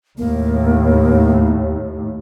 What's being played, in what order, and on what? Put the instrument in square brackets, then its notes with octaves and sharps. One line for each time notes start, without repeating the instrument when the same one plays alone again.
[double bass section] D#2 A2 [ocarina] A#3